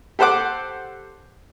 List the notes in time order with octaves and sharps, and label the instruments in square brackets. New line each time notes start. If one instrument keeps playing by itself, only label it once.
[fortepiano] G4 A4 C5 F#5 D6